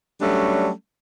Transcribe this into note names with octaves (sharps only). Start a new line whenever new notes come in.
F#3 G3 A3 C#4 D4